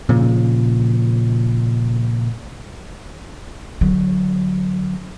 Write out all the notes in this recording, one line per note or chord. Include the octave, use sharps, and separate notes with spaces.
A#2 C#3 F3
D3 F#3